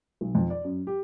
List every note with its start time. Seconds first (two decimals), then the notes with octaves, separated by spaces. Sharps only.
0.21 B1
0.35 F2
0.50 D5
0.64 F#2
0.87 G4